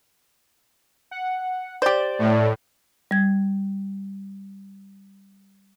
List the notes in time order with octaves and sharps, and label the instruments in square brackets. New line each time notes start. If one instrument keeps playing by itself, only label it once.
[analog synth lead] F#5
[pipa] G4 C5 [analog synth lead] D5
[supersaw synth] A2
[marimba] G3 G#6